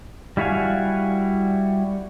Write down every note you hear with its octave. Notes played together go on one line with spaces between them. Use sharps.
G3 E4 F#4 F5 G#5